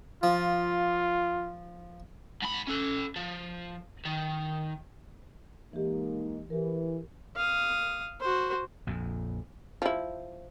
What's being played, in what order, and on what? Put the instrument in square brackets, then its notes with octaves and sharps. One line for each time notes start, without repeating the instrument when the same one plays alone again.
[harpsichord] F3 [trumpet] F4
[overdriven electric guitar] G#2 B5
C#4 A4
F3
D#3
[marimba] E3 G4 [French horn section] G#3 A#3 D#4
[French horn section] E3 [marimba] G4 A#4
[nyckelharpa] F5 D#6
F#4 C5
[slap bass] A#1 F2
[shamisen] F3 E4